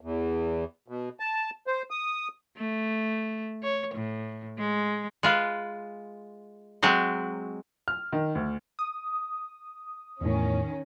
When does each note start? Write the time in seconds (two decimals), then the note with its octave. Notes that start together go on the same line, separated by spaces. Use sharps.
0.01 E2
0.88 B2
1.20 A5
1.67 C5
1.91 D#6
2.57 A3
3.63 C#5
3.95 A2
4.58 G#3
5.23 G#3 F4 B4
6.83 F#3 G#3 C4
7.88 F6
8.13 D#3
8.35 D2
8.79 D#6
10.21 E2 A2 D#3 C#4